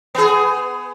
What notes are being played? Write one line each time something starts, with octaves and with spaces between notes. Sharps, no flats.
B3 G#4